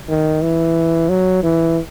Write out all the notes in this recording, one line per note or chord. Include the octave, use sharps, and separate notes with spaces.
D#3
E3
F#3
E3